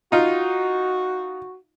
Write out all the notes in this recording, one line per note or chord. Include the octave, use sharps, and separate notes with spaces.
D#4 F4 F#4